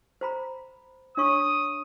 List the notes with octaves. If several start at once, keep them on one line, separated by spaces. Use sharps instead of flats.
C5 A#5 B5
D4 C#5 C#6 D#6